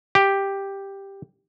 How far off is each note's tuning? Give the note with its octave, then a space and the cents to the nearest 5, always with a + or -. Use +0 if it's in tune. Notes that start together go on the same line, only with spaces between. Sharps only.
G4 +5